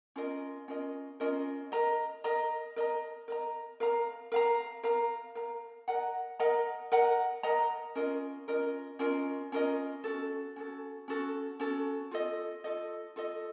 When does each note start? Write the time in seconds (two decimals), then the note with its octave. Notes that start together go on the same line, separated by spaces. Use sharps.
0.16 C#4 F4 A#4 D#5
0.68 C#4 F4 A#4 D#5
1.20 C#4 F4 A#4 D#5
1.72 A#4 D#5 A#5
2.24 A#4 D#5 A#5
2.76 A#4 D#5 A#5
3.28 A#4 D#5 A#5
3.80 A#4 F5 A#5
4.32 A#4 F5 A#5
4.83 A#4 F5 A#5
5.35 A#4 F5 A#5
5.88 A#4 D#5 F#5 A#5
6.40 A#4 D#5 F#5 A#5
6.92 A#4 D#5 F#5 A#5
7.43 A#4 D#5 F#5 A#5
7.95 C#4 F4 A#4 D#5
8.48 C#4 F4 A#4 D#5
8.99 C#4 F4 A#4 D#5
9.52 C#4 F4 A#4 D#5
10.04 C#4 F#4 A4
10.56 C#4 F#4 A4
11.08 C#4 F#4 A4
11.60 C#4 F#4 A4
12.11 F4 A4 D#5
12.64 F4 A4 D#5
13.16 F4 A4 D#5